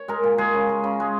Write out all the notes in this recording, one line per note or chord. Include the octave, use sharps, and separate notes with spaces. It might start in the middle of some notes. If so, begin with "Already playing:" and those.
Already playing: C#5
G#3 A#4
A#2
G#3 G#4
C#3
G#3
C#3
G#3